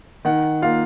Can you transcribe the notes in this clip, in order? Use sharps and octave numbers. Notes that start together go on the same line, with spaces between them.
D#3 F#5
A#3 F4 F5